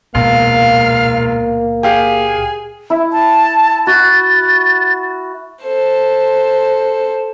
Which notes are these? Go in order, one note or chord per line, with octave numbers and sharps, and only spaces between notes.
E1 C#2 A#2 A#3 B3 F5
G4 G#4 F5
E4
A5
F#4 A6
A4 C5